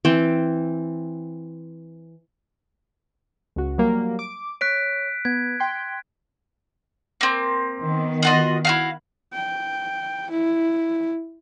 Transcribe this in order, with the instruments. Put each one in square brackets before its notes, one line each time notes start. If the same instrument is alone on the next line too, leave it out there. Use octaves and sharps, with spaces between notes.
[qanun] E3 C4 G5
[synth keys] C#2 F#4
F#3 G3 A#3
D6
[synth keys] C#5 [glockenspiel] F#6 B6 D7
[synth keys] B3 [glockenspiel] G#6
[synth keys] G5 C6
[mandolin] A#3 C4
[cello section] D#3 B3
[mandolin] F4 F#4 D#5
E4 F#4 F5
[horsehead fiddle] G5
E4